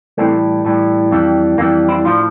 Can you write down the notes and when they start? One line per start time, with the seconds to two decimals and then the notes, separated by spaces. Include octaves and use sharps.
0.18 A2 E3 G3 A3 C4
0.65 A2 E3 G3
1.11 F2 E3 G3
1.58 F2 E3 G3 A#3
1.89 C4 E4
2.04 A2 F3 D4 F4